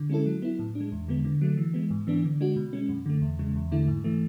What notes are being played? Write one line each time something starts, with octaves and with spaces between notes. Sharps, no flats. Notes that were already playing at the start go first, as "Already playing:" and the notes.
Already playing: D3
G#3 C#4 E4 A4
F#3
B3 E4
A2
D4
G#3
E2
D3 G#3 B3
D3
F#3 A3
E3
G#3 B3
G#2
E3 B3 D4
D3
G#3 D4 F#4
B2
G#3 C#4
F#2
D3 A3
E2
C#3 G#3
E2
D3 A3 E4
G#2
E3 A3